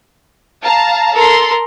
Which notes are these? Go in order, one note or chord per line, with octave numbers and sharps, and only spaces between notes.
F5 A5 A#5
A4 A#4 C6